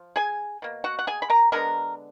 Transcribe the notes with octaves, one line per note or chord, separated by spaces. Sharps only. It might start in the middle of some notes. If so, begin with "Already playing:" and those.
Already playing: F3
G#4 G#5
B2 A#3
F#4 F#5
F#5
G#4 G#5
B5
A#4 A#5
D3 G#3 B3 A#4 A#5